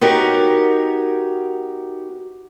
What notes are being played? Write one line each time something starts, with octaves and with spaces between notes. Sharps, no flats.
B3 D#4 F#4 G4 A#4 C#5